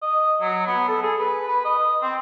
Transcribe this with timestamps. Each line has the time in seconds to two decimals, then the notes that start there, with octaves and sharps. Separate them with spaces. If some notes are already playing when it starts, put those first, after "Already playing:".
0.02 D#5
0.41 F#3
0.67 B3
0.88 A4
1.03 G#4
1.19 B4
1.48 B4
1.65 D#5
2.02 C4